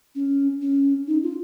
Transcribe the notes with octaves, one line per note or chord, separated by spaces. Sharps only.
C#4
C#4
D#4
F4